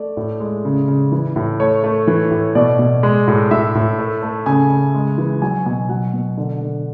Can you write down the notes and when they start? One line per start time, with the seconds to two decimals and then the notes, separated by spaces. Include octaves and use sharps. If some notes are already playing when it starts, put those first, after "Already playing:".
Already playing: A3 D5
0.17 A2
0.40 G#3
0.65 C#3
0.88 C#3
1.12 E3
1.36 A2
1.60 A3 C#5
1.84 A3
2.07 E3
2.31 A2
2.55 B2 D5
2.79 B2
3.03 G#3
3.28 A2
3.51 A2 E5
3.75 A2
3.99 A3
4.22 A3
4.46 C#3 G#5
4.70 C#3
4.95 G#3
5.18 E3
5.42 F#3 G#5
5.66 B2 G#5
5.89 F#3 F#5
6.13 B2
6.37 D3
6.61 D3